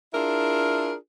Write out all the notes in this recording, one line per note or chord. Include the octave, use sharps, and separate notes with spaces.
D4 E4 F4 G#4 A#4